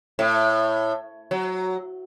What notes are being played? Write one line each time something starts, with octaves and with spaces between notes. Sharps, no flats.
A2
F#3